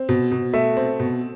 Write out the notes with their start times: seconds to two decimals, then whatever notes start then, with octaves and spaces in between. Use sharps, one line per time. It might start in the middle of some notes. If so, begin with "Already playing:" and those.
Already playing: C4
0.09 B2
0.32 B2
0.53 A3 E5
0.77 C4
1.00 B2